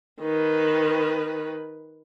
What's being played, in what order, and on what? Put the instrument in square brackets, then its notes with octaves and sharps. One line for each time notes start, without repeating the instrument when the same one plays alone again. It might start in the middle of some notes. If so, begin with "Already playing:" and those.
[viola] D#3 B4